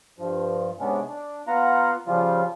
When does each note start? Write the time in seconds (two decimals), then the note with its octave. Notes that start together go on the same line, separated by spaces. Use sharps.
0.19 G2 F3
0.80 G#2 C3 G#3 B3 C#4 D4
1.08 D4
1.47 B3 F4 F5 F#5 A#5
2.07 C#3 F3 G3 F4